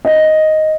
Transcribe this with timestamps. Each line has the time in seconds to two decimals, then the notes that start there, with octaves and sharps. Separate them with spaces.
0.05 D#5